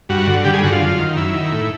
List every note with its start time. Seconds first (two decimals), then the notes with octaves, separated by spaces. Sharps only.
0.09 G2 F#4
0.27 D3
0.44 G2 G4
0.53 G#4
0.63 D3 F#4
0.73 F4
0.81 F#2
0.99 D#3
1.17 F#2 E4
1.34 D#3
1.52 A2